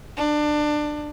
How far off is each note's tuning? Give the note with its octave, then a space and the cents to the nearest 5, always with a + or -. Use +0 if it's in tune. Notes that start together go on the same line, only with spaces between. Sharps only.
D4 +20